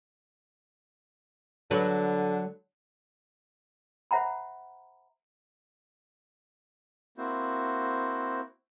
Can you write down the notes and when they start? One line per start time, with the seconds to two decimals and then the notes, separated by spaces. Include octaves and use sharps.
1.71 D3 F#3 B4
4.11 C5 E5 F#5 A#5 B5
7.18 A#3 C4 E4 F#4 C5